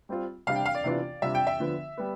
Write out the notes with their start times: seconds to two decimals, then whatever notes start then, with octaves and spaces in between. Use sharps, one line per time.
0.09 G3 C4 F4
0.47 C3 G3 D4 G4 F5
0.56 G5
0.65 F5
0.75 D5
0.84 C3 E3 B3 D4 F4
1.22 C3 G3 D4 F4 E5
1.35 G5
1.47 E5
1.60 D3 F3 B3
1.97 G3 B3